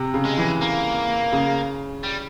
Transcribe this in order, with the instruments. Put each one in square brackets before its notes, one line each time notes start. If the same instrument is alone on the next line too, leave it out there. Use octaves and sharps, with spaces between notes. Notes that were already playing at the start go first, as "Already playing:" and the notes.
Already playing: [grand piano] C3
C#3
[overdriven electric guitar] G#3
[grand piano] E3
[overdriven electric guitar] A#3
[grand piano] C#3
[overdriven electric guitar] G3